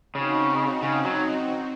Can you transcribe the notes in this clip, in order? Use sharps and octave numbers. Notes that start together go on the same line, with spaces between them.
C#3 C4 D#4 F#4
C#3
F#3